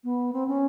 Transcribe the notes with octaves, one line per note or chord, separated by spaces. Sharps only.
B3
C4
C#4